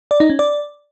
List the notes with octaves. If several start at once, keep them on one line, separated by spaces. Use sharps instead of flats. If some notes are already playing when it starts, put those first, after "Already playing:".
D5
D#4
C#4
D5